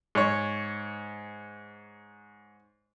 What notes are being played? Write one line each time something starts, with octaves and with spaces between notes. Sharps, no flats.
G#2 C#5